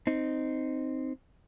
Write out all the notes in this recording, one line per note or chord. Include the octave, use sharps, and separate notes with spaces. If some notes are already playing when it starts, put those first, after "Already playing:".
C4 D#4